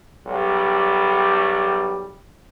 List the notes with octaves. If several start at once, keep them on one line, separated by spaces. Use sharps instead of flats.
B1 G3